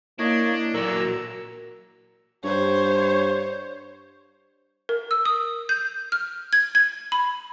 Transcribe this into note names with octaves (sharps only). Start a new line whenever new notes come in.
A#3 D4 E4 C#5 D#5
A#2 F#3 F#4 A#4 A#5 E6
G2 C5 C#5
A#4
E6
D#6
G6
F6
G#6
G#6
B5